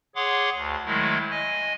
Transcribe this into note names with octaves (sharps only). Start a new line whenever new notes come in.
G#4 C#5 F#5 C6 D6
D2
D#3 F#3 G#3 A3 E4
D#5 G#5